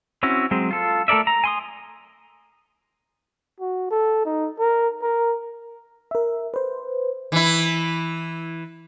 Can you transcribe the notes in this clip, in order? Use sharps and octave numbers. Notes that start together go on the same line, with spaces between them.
C4 C#4 E4 F#4
F#3 G#3 C4
F4 A4
A3 A4 A#4 D5 E5
A#5
G#5 C6 D#6
F#4
A4
D#4
A#4
A#4
A#4 E5
B4 C5
E3 E4